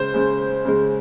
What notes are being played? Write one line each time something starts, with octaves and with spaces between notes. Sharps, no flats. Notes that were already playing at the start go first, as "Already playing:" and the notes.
Already playing: C#3 G#3 C5
C#3 G#3
C#3 G#3